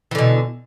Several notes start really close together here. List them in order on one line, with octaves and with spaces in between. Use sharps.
E3 D3 B2